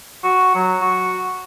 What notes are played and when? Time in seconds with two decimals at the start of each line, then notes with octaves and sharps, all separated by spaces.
0.24 F#4
0.55 F#3
0.82 F#4